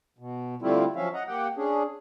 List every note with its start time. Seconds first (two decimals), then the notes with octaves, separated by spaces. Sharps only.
0.19 B2
0.62 D3 G3 A3 C4 E4 F4
0.96 F3 F#3 C#4 E5 F5
1.14 D#5 F#5 A#5
1.27 A#3 G4 F#5 G5
1.57 C#4 D4 G#4